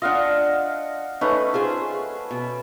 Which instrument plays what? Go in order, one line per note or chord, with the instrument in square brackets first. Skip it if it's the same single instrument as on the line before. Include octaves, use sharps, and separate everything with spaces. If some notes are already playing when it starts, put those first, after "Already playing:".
[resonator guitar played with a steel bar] D4 F4 [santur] D#5 F5 F#5
[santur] A3 C#4 B4 [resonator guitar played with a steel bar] D#4
[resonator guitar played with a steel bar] F4 G#4 C5
B2